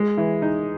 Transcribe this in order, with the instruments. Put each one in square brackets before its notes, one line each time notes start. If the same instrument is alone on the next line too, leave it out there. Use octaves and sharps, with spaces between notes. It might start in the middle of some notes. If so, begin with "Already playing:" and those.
Already playing: [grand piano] G#3
E3
D#4